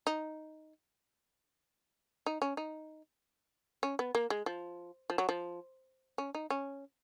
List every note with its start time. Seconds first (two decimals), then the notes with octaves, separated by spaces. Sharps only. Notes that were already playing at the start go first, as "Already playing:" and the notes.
0.07 D#4
2.26 D#4
2.42 C#4
2.57 D#4
3.83 C#4
3.99 B3
4.15 A#3
4.30 G#3
4.46 F3
5.10 F3
5.18 F#3
5.29 F3
6.18 C#4
6.35 D#4
6.50 C#4